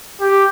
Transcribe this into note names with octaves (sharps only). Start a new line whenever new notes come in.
G4